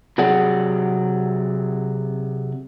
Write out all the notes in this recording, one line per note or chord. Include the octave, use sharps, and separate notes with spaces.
C3 F#3 G#4 D5 F#5